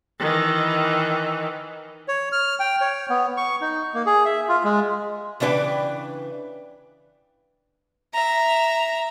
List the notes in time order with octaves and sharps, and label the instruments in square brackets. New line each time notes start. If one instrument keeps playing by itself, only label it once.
[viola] D#3 E3
[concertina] C#5
F6
G5
C#5
B3
C#6
D#4
A#3
G#4
E5
F4
G#3
[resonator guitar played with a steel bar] C#3 E3 D4 B4 G5
[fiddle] E5 A#5